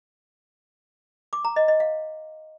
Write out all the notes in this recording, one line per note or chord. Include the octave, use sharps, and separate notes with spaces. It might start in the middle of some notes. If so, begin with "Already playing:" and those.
D6
A#5
D#5
D#5
F5